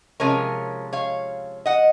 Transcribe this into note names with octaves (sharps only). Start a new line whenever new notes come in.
C3 F3 G#3 C#4 A#4 C#5
C#5 F5
D#5 F#5